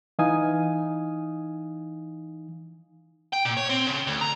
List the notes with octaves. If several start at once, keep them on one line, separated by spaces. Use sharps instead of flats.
E3 D#4 F5 G#5 D#6
G5
A#2
C#5
C4
C#3
D2
A#5